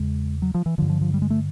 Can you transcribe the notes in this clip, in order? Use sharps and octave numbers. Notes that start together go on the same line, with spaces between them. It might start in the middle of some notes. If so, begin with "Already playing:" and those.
Already playing: E2 C#3 G#3
F#3
F3
E3
G2 D3 F3
F3
F3
G3
G#3
A3